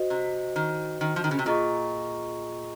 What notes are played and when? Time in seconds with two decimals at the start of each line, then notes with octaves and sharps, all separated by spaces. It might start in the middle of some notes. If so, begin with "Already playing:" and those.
Already playing: F#4 C5 D#5
0.10 C3
0.56 D#3
1.01 D#3
1.16 F3
1.24 D#3
1.31 C#3
1.39 C3
1.46 A#2 F4 G#4 D#5 A#5 C#6